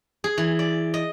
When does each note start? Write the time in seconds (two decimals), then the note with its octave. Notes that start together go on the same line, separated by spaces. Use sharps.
0.24 G#4
0.38 E3
0.59 D5
0.94 D#5